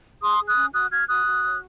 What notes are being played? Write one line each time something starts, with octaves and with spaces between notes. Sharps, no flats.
G#4 C6 D#6
G#4
D#6 F#6
C#4
F#4 D#6 F#6
F#4 F6 G#6
F#4 D#6 F#6
F#4
C#5